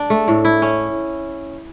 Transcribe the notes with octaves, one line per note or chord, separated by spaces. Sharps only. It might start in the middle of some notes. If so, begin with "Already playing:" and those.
Already playing: D4
A3
A2
E4
C#4